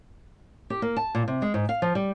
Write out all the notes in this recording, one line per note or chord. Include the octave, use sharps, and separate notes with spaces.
G4
A#3
A5
A#2
C3
G#3
G#2
F5
F3
G3